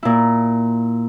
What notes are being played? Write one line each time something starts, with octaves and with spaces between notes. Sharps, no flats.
A#2 E4